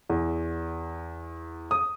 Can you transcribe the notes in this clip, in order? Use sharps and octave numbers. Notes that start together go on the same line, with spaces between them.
E2
D#6